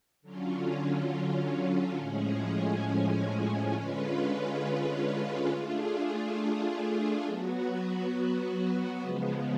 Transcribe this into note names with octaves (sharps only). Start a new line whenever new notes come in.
D3 F#3 C#4 F4
A2 F3 G#3 C#4 G#4
D3 G#3 C#4 F4 B4
A3 D4 F4 G#4
F#3 B3 F#4
C#3 F3 G#3 B3